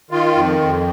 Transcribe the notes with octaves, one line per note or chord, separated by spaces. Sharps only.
D#3 F4
F2
F2